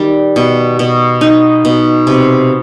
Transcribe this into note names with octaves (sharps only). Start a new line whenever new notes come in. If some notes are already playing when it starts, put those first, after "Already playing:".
Already playing: D#3 G3
B2
B2
D#4
B2
C3